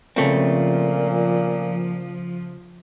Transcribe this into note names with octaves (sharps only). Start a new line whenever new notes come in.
A#2 C#3 F3 A3 C4